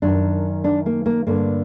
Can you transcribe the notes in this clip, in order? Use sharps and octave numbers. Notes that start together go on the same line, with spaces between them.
F#2 D#3 D4
D4
A#3
A#3
G2 D3 A#3